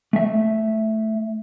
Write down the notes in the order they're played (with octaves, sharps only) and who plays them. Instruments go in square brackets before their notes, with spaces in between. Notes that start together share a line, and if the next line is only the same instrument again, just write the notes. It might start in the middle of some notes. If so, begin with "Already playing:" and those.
[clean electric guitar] A3 E5